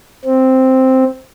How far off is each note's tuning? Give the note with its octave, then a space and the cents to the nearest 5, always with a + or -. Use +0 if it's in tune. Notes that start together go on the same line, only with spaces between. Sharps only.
C4 +0